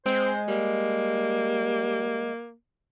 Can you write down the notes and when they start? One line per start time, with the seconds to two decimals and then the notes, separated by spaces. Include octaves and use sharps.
0.06 G#3 C4 C5
0.48 G3 A#3